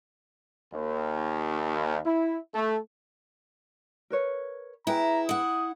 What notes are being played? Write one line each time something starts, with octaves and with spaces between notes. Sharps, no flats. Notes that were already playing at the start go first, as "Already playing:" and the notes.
D#2
E4
A3
A#4 B4 C#5
E4 G#4 B4 G5 A#5
E4 F#5 D#6